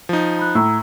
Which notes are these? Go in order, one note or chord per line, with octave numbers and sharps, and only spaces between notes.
F3 D#4
B5 F#6
A2 A#5 E6